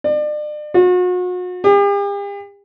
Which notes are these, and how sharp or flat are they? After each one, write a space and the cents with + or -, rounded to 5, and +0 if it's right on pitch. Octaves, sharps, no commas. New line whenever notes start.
D5 +35
F#4 -40
G4 +45